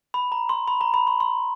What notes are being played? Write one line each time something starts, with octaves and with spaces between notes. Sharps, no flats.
B5
A#5
C6
B5
A#5
B5
C6
C6